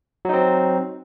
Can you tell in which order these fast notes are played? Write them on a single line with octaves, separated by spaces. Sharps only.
F#3 D#4 C4